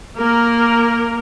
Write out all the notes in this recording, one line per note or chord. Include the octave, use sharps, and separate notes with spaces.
A#3 A#4